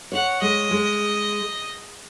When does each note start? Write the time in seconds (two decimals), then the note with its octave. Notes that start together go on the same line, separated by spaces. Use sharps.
0.12 C#5 F#5
0.42 G#3 D#5
0.71 G#3